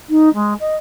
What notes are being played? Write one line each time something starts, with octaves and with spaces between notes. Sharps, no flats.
D#4
G#3
D#5